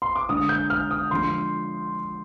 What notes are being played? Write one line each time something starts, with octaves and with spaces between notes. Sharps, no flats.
C6
D6
D3 G#3 D#6
G6
F6
D#6
D3 F3 G#3 C6